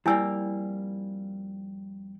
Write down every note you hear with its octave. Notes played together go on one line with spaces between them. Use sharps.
F2 G3 A#3 E4 G#5 E6